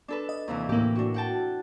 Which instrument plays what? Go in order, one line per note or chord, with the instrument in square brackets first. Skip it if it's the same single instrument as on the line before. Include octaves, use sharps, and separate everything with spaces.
[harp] D4 A4 B4
[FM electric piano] D#5
[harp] D#2 C3 E3
[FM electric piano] A2 A#3 [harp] E4 G4
[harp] D4 F#4
F#5 G5 A5